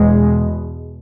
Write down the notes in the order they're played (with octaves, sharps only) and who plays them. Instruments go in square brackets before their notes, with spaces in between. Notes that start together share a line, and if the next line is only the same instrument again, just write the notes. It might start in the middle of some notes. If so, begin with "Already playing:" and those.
Already playing: [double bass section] E2 B2 G#3